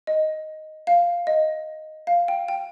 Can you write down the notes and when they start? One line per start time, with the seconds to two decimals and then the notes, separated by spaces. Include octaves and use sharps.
0.07 D#5
0.87 F5
1.27 D#5
2.07 F5
2.28 G5
2.48 G5